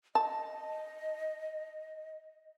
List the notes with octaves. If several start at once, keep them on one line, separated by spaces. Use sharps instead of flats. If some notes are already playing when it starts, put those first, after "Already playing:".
D#5 A5